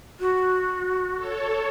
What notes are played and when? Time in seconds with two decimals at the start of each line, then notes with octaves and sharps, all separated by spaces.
0.20 F#4
1.16 A4 C#5